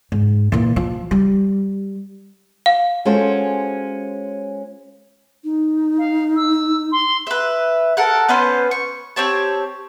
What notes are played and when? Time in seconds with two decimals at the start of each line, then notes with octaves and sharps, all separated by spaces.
0.12 G#2
0.52 A#2 E3
0.76 F3
1.11 G3
2.66 F5
3.05 G#3 C#4 F4 F#4 A4 C5
5.44 D#4
5.98 F5
6.36 E6
6.92 C6
7.27 B4 E5
7.97 A4 A#4 F#5
8.29 B3 C#4 B4 C5
8.71 C#6
9.16 C4 G4 C#5 A5